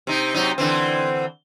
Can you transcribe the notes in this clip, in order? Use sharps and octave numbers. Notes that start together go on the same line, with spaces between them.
C3 D#4
C3 F#3 D#4
D3 E3 C4